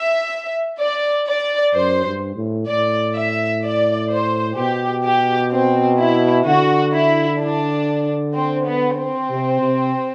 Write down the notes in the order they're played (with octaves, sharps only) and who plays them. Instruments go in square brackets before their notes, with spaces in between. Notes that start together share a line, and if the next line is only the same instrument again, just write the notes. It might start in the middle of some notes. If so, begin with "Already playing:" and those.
Already playing: [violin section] E5
D5
D5
[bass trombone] F#2 [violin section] C5
[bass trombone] G2
A2
[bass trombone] A2 [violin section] D5
[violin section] E5
D5
C5
[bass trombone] B2 [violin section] G4
[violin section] G4
C4
E4
[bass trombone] D3 [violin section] F#4
[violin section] E4
D4
C4
B3
C4
[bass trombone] C3
C3